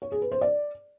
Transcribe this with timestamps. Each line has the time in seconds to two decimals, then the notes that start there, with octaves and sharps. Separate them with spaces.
0.02 C#5
0.12 G#4
0.22 B4
0.31 C5
0.41 D5